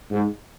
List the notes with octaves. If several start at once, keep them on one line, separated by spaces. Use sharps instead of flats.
G#2